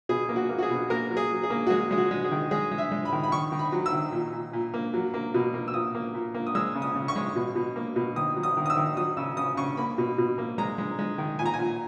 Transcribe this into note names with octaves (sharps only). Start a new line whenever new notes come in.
B2 G#4
A#3
F#4
A#3
F#4
G#4
B2
A#3 A#4
F#3
G#4
F#3
G#4
A#3
F#4
G#3 G#4
G#3 G#4
F#4
G#3
G#4
D#3
G#3 G#4
G#3
E5
G#3
B5
D#3
B5
D#3 C#6
D#3
B5
F#3
E6
D#3
A#2
A#2
A#2
A#3
F#3
A#3
B2
A#3
E6
A#2 D#6
A#3
A#2
A#3
D#6
G#3 E6
C#3
D#6
C#3
C#6
G#3
B2
B2
A#3
B2
D#3 D#6
F#3
D#6
D#3
D#6
E6
D#3
F#3 D#6
C#3 E6
C#3 D#6
C#3 C#6
A#3 B5
B2
B2
A#3
G#3 A#5
G#3
G#3
D#3
A#2 G#5
A#5
G#5
A#2